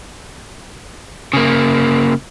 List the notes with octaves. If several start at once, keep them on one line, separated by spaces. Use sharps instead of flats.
C#3 A#3